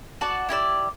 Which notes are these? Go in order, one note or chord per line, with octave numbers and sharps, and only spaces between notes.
F#4 D5 A5
E4 G4 D5 E6